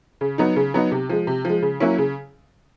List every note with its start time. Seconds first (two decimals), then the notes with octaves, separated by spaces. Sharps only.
0.21 C#3
0.38 F#3 B3 D#4
0.56 C#3
0.74 F#3 B3 D#4
0.92 C3
1.09 F3 G#3
1.27 C3
1.45 F3 G#3
1.62 C#3
1.80 F#3 A#3 C#4 E4
1.98 C#3